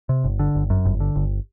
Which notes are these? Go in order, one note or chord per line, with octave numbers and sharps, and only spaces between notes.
C3
G1
D3
G1
F#2
G1
D3
G1